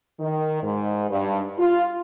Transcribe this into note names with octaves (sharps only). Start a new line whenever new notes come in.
D#3
G#2
G2
F4